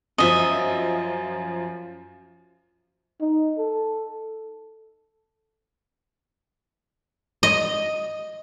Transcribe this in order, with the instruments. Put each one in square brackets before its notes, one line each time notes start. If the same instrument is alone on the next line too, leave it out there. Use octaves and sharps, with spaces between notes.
[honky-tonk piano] F#2 F3 [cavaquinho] D#5 E5
[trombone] D#4
A4
[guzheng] D#5